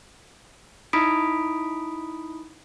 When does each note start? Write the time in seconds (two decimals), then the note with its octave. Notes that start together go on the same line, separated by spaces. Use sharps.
0.93 D#4 E4 B5 D#6 B6 D7